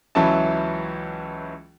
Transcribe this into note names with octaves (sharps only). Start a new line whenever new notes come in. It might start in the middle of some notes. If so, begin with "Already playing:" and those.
C#2 E3 F#3 C#4 E4 A5